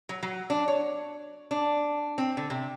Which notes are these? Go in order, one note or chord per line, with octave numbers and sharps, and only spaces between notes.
F#3
F#3
D4
C#5
D4
C4
D3
C3